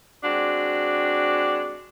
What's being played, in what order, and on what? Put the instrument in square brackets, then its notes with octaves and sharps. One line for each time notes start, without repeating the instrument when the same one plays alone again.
[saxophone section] G#3 C4 D4 F#4